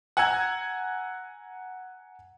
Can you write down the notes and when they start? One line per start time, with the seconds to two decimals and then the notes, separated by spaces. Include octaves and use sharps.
0.17 F#5 G#5 A#5 E6 G#6